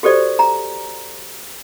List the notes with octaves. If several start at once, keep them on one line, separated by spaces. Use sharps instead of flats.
F#4 G4 A4 C5 D5
A#5